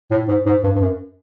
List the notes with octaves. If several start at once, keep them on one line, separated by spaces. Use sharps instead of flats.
A2
G#2
G#2
G2
G2
F#2